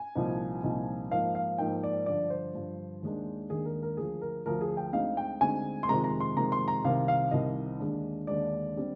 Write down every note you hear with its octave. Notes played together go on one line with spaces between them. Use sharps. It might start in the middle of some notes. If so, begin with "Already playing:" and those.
Already playing: G#5
C2 A#2 F3 C4 D#4
C2 A#2 F3 C4 D#4
G#2 F3 A#3 D#4 F5
F5
G#2 F3 A#3 D#4 G5
D5
G2 D3 F3 D5
C5
G2 D3 F3
D#2 D#3 G#3 D4
D#2 D#3 G#3 D4 G#4
A#4
A#4
D2 D3 F3 G#4
A#4
D2 D3 F3 A#4
G#4
G5
D2 D3 G#3 C4 D#4 F5
G5
D2 D3 G#3 C4 D#4 G#5
C6
F2 C3 D#3 G#3 A#5
A#5
C6
F2 C3 D#3 G#3 A#5
C6
A#5
C2 C3 D#3 F5
F5
C2 C3 D#3 D#5
D#2 D3 G#3 D4
D#2 D3 G#3 D4 D5
D3 G3 C4